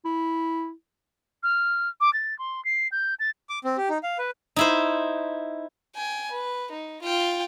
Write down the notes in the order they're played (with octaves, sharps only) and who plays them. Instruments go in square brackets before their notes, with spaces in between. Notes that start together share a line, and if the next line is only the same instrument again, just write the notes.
[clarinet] E4
[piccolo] F6
D6
A6
C6
C7
G6
A6
[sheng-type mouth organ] D6
C4
G4
D#4
F5
B4
[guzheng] D#4 E4 C5
[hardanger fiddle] G5 G#5
B4
D#4
F4 G5